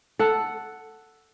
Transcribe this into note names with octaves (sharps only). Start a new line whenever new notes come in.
A4 F#5